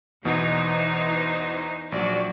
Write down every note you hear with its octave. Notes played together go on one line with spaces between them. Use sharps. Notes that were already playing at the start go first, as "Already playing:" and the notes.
E2 B2 E3 D#4 C5 F#5
A#1 F#3 F#4 D5